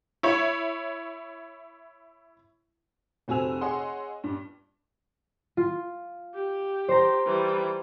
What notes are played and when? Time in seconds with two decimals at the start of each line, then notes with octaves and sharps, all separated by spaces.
0.23 E4 C#5
3.28 F1 C4 F#4 G#5 E6 F7
3.61 G#4 C#5 D#5 F#5 C6
4.24 G2
5.57 F4
6.34 G4
6.89 C5 A#5
7.26 E3 G3